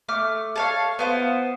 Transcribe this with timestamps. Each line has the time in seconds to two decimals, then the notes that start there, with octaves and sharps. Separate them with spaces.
0.08 A3 D6 F6
0.56 A4 C#5 F5
0.99 B3 F4 C5